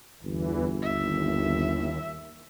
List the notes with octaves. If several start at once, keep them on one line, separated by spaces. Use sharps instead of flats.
G1 E2 E3
D#2 E5